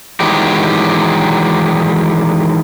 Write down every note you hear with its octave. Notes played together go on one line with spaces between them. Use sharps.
D#3 E3 F#3 G#3 G4